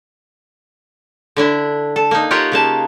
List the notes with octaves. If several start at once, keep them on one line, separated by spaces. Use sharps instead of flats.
D3 D4 E4
A4
A#3 D#4
F4 G4 A#4 C#5 F#5
C#3 A#3 A5